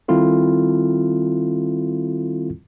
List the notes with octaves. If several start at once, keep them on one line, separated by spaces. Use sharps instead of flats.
D#3 G3 C4 E4 F4 A4